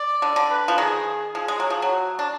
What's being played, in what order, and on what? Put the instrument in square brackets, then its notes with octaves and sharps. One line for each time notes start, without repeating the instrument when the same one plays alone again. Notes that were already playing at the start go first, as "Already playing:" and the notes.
Already playing: [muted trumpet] D5
[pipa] D3
D3
[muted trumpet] B4
[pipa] F3
[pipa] D#3 [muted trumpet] G#4
[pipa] F3 [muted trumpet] G#4
[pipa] G#3
[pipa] F#3 [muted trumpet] G#4
[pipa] F3
F#3
[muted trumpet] F#4
[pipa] D4